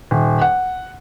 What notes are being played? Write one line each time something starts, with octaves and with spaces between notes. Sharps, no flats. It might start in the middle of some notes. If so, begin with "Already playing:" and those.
D#1
F#5